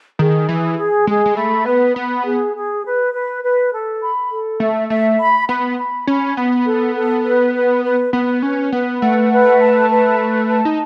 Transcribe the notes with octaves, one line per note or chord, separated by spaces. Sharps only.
D#3 G#4
E3 G#4
G#4
G#3 G#4
G#3
A3 B5
B3 B4
B3 B5
G#4
G#4
B4
B4
B4
A4
B5
A4
A3 E5
A3 E5
B5
B3 B5
B5
C#4 B5
B3 B5
A4
A4
B4
B4
B4
B3 B4
C#4 B4
B3 B4
A3 F#5
B4
A5
B4
A5
A5
D#4